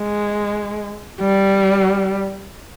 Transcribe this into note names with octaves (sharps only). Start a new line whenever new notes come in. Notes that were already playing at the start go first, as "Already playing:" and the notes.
Already playing: G#3
G3